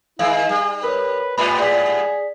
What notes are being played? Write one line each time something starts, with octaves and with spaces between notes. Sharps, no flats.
D#3 G#3 E4 F5
G3 G#4
A#4 B4 C#5
G#2 G3 B3 B4 E5 B5
G#4 D5 B6